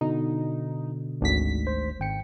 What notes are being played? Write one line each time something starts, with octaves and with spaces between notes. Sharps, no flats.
B2 D3 D#4
G#1 D2 B6
C5
G#1 G5 C#7